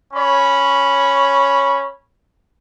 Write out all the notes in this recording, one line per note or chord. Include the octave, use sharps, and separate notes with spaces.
C#4 C#5 B5